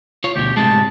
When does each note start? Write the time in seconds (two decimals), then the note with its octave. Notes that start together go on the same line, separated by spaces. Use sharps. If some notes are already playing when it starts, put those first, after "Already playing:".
0.24 F4 C#5
0.36 D2 B2 G4
0.57 A2 C3 G#3 A5